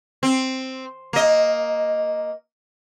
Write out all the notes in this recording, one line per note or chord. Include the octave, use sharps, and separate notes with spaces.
C4
A#3 D#5